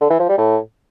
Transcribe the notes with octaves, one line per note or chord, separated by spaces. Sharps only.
D3
E3
F3
G3
A2